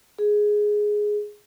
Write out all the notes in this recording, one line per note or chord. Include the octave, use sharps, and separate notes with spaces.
G#4